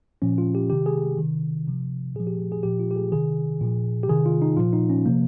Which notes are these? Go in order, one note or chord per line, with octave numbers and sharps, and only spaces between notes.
A#2 F3 C#4
F4
G4
C3 D#3 G4
G#4
C3 D#3
C3 F3
A#2 F3 G#4
G4
G#4
A#2 F3 G4
F4
G4
G#4
C3 D#3 G#4
A#2 F3
G4
C3 D#3 G#4
F4
D#4
A#2 F3 F4
D#4
C#4
C3 F3 A#3